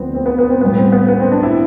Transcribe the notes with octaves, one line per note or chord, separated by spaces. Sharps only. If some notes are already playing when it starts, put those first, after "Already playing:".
Already playing: D2 D3 F3 B3 C4
C4
B3
B3
C4
A2 G3 B3
C4
B3
B3
C4
D4
E4